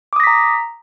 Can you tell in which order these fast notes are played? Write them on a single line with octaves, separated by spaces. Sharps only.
D6 D#6 A#6 B6 A#5